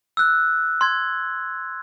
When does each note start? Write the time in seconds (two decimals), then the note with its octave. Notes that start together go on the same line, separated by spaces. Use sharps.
0.17 E6 F#6
0.81 C6 G#6